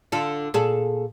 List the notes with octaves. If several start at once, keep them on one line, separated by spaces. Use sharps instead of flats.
D3 F4 A4
A#2 G#4 A4